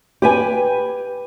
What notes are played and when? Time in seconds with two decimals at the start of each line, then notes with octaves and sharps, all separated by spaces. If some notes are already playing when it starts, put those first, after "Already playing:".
0.22 G4 B4 G#5